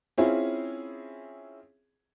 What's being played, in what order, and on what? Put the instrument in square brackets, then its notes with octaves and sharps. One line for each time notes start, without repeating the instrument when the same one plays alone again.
[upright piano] C4 C#4 E4 F4 G#4